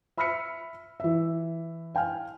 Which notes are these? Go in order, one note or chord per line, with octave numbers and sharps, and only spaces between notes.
E5 B5 E6 F6 B6 C#7
E3 E5
F5 G5 G#5 F6